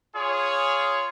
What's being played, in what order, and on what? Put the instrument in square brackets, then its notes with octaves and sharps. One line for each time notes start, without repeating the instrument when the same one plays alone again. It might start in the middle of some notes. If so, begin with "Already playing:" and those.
[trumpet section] F4 G#4 C#5